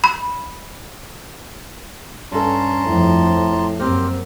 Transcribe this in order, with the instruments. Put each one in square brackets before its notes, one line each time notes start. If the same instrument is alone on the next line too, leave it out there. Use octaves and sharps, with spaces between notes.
[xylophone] B5
[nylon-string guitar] G2 A4 [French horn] C#4 [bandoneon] A5 A#5 C6
[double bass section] F2 F3 [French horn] A2
[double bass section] F#2 [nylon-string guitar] A#3 C4 [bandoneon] G4 C5 F6